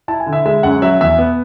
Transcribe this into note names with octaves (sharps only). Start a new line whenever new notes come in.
E4 A5
G#5
D3
E5
G#3 E5
F#2 F#5
F#3 E5
E2 E5
B3